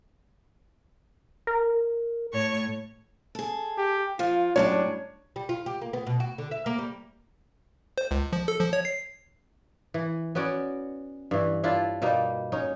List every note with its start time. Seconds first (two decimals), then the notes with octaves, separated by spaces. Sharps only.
1.47 A#4
2.33 A2 C#5 C#6
3.35 G#4 A4
3.78 G4
4.19 F3 F4
4.56 F#2 A2 G3 D4 C#5
5.36 G3
5.49 F4
5.66 G4
5.81 A#3
5.93 B3
6.07 B2
6.20 F#4
6.38 D3
6.51 E5
6.66 A#3
6.79 G3
7.98 C5
8.11 C#2
8.33 F3
8.48 A4
8.60 F3
8.73 C#5
8.85 C7
9.94 E3
10.35 B3 C#4 F#4 D5
11.31 G2 E3
11.64 D4 E4 F4
12.02 B2 G3 A#3 D#4
12.52 C#4 D#4